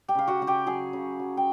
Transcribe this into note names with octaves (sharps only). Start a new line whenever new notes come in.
G4 G5
C#3 F5
F#4 F#5
C#3 F#5
G4 G5
F#3 G#4 G#5
C#3
F#3
G5